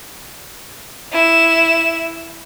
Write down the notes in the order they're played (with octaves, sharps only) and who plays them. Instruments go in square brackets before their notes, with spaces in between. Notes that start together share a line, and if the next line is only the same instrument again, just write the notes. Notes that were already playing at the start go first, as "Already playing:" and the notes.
[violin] E4 E7